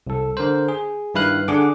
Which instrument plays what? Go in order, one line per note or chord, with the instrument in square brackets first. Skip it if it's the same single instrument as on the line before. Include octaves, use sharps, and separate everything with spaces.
[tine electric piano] C2 A4
D3 A#4 C5
G#4
G2 D#3 E4 B4 F5 F#6
D3 D4 G#4 F#5 D6